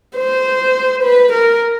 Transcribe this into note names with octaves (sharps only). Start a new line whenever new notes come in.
C5
B4
A#4